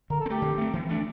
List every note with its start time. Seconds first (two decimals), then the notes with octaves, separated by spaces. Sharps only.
0.10 D3 A#4
0.20 A4
0.26 C4
0.30 A3 G4
0.42 D3
0.58 A3 C4
0.73 E3
0.89 A3 D4